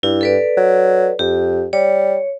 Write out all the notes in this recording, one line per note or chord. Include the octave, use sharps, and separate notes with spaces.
G2 E4
A4 B4 D5
F#3
F2 G4
G3 C#5